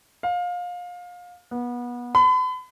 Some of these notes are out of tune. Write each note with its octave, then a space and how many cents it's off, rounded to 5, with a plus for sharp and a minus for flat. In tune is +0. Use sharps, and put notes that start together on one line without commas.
F5 +25
B3 -25
B5 +40